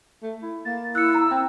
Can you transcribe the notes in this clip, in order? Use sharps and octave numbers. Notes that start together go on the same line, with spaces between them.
A3
E4
A#3 A6
E4 E6 F#6 C#7
A#5
C4 G5